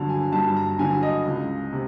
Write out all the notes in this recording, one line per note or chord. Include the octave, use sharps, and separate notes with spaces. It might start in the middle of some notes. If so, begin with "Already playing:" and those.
Already playing: G2 D3 F#3 A5
G#5
G2 A5
A#5
D3 F#3 G#5
D#5
C#2
C3